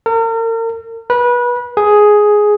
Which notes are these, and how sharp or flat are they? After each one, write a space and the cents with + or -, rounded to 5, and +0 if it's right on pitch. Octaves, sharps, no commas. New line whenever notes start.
A#4 -40
B4 -25
G#4 +5